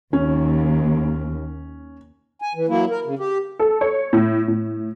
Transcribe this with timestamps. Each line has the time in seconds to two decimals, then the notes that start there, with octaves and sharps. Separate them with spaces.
0.13 D#2 C#4
2.42 G#5
2.55 E3
2.68 F#3 A#3 E4
2.90 A#4
3.05 C#3
3.19 G4
3.59 A4
3.81 C#5
4.13 A2
4.48 A2